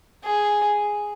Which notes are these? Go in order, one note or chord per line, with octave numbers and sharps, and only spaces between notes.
G#4